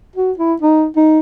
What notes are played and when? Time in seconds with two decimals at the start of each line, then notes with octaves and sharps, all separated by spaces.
0.16 F#4
0.38 E4
0.62 D#4
0.96 D#4